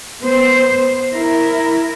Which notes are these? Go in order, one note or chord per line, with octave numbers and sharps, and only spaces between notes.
B3 C5
E4 A#4